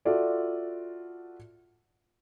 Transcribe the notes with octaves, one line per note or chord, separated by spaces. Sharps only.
F4 F#4 A4 D5 E5